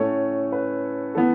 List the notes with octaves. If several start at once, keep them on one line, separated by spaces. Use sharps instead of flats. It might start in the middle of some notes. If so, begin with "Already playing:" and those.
Already playing: A2 A3 C#4 A4 C#5
B4
E3 B3 A4